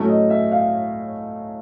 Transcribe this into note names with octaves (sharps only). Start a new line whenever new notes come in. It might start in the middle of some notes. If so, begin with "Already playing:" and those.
Already playing: A2 F#3 A3 C#4
D#5
E5
F5